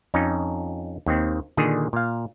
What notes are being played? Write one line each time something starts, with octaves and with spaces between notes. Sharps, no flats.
F2 C#4 D#4
D#2 D#3 C4
A#2 D3 D#3 G#4
A#2 F5